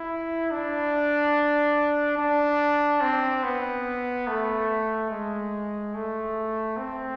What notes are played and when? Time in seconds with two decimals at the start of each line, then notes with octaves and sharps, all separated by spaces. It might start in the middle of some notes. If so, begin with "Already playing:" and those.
Already playing: E4
0.51 D4
2.18 D4
3.01 C4
3.44 B3
4.28 A3
5.10 G#3
5.94 A3
6.77 C4